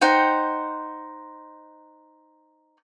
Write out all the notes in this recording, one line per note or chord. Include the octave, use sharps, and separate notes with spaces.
D#4 C5 F#5 G5